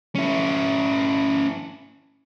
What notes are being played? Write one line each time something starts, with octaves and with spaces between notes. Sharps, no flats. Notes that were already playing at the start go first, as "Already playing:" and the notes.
C#4 E4